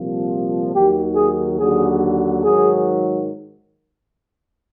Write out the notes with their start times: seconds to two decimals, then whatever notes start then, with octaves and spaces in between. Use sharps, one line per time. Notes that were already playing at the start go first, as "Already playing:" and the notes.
Already playing: C2 A#2 F3
0.73 D#2 D#3 F#3 G4
1.16 G#4
1.59 D#2 D3 F#3 G#4
2.44 G#2 D#3 F#3 G#4